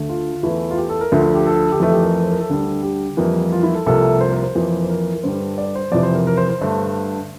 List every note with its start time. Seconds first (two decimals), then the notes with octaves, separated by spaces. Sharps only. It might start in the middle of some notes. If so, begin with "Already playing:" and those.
Already playing: D2 D3 A3
0.09 F4
0.43 E2 E3 A3 E4
0.71 F4
0.77 G4
0.89 A4
1.01 A#4
1.12 D2 D3 F3 A3 A4
1.35 G4
1.46 A4
1.72 G4
1.80 F2 E3 A3 A4
1.92 G4
2.03 A#4
2.15 A#4
2.23 C5
2.32 A#4
2.41 A4
2.50 D2 D3 G3
2.83 G4
3.17 F2 E3 G3 A#3 E4
3.52 F4
3.63 E4
3.75 A4
3.86 C2 C3 F3 A#3 A4
4.21 C5
4.32 A#4
4.43 C5
4.55 F2 E3 A#3
4.84 C5
4.90 A#4
5.15 A#4
5.23 G2 D3 G3 C5
5.58 D5
5.75 C5
5.92 F2 C3 E3 D5
6.03 C5
6.15 A#4
6.27 A#4
6.37 C5
6.49 C5
6.61 G2 D3 A3